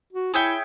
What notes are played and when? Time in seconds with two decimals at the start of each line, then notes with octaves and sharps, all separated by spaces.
0.13 F#4
0.34 E4 G#4 C#5 E5 G5